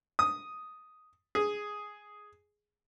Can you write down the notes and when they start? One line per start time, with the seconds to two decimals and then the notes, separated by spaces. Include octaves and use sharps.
0.19 D#6
1.35 G#4